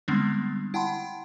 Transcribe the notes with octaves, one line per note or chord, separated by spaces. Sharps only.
D3 G3 G#3 B3 C4 D4
E4 F#5 G5 A5 B5 C6